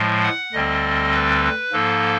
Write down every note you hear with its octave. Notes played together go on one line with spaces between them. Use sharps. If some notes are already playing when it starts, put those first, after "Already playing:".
Already playing: A2 F3 G#3
F#5
D2 D3 G3 C4 D#5
B4
G#2 F3 A#3 A4